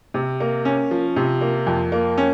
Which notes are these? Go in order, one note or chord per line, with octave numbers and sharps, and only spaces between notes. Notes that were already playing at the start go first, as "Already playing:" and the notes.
C3
A#3
C#4
F3
C3
A#3
F2
A#3
C#4